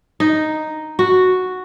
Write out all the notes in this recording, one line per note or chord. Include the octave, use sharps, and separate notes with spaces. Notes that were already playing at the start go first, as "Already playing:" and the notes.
D#4
F#4